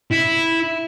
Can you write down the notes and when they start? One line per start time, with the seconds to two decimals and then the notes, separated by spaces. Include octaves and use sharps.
0.11 E4